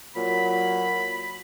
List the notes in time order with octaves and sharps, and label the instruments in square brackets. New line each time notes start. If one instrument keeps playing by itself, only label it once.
[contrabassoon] A#2 [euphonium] F#3 [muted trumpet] B5